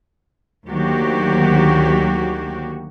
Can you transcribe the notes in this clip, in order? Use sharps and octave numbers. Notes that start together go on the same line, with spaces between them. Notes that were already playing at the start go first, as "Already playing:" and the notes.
D2 D#3 F#3 A#3 F#4 G4